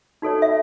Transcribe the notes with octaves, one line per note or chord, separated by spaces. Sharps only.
D#4 F#4 A4 C#5
E5